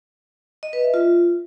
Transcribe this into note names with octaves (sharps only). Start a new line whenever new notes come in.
D#5
B4
E5
F4